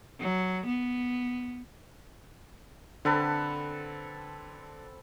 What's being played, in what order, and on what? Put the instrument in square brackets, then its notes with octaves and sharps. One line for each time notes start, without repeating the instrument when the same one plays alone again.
[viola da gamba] F#3
B3
[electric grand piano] D3 [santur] C4 A4 B4